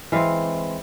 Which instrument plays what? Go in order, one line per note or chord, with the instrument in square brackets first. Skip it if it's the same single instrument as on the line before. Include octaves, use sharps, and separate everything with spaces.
[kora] E3 G#3 C4 F5